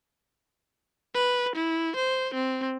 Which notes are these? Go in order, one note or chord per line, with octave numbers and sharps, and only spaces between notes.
B4
E4
C5
C4